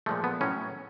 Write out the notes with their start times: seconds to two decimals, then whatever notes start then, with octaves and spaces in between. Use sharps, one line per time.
0.06 A#2 F3 G#3 A3
0.24 B3
0.41 A2 F#3 C#4